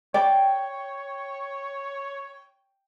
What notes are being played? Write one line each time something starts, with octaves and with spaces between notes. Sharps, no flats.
C#5 D5 G5